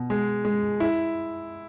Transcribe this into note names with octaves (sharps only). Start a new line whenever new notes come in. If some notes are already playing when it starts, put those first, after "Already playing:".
Already playing: B2
G#3
G#3
E4